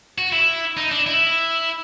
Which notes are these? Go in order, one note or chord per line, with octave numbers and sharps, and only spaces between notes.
F#4
E4
D#4
D4
E4